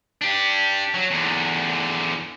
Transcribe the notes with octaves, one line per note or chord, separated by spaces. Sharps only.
D4 G4
F#3
E2 D3